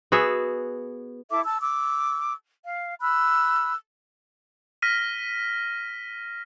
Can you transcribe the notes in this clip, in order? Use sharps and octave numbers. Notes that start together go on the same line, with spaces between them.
B3 F#4 G#4 E5
E4 A4 E5 D6
A5 E6
D6 E6
F5
B5 E6 F#6
F6 A#6 B6 D#7